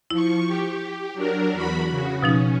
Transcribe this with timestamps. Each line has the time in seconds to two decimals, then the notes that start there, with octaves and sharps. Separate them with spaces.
0.10 F3 E4 C#6
0.47 G4
1.14 F#3 D4 A#4
1.54 E2 F#4 B5
1.90 C#3 F#4
2.22 B2 F3 C#4 D#4